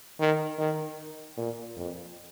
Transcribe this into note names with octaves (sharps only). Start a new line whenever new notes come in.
D#3
D#3
A#2
F2